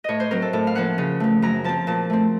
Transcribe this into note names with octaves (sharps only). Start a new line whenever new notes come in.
A2 C#5 D#5
C5
F#3 C4 A#4
A4
A2 A4
F5
F3 A#3 C#4 F#5
C#3
F3 A3
F#2 A#5
F3 C4 A5
A#2 A5
A3 C4